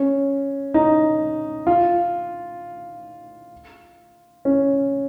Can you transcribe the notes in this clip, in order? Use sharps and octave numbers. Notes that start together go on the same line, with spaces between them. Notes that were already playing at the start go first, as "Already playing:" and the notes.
Already playing: C#4
D#4
F4
C#4